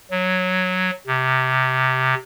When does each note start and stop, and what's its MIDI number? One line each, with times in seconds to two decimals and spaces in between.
0.11 0.91 54
1.07 2.14 48